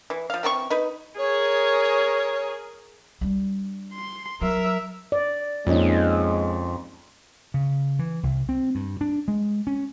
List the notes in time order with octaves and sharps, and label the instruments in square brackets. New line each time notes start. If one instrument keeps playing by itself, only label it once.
[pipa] E3
F3 F5
E3 C4 A4 C#6
D#4 B4
[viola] G#4 A#4 [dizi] C#5
[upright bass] G3 D4
[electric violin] C6
[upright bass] F#3 [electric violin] A#4 E5
[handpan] D5
[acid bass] F2 [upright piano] A#2 C#4 D#4 [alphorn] G#3
[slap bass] C#3
E3
C2
C4
G2
D4
G#3
C#4